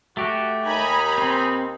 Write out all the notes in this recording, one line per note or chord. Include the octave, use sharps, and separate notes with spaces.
A3 F#4 G4
D#2 D#4 G#5 A#5 B5
C4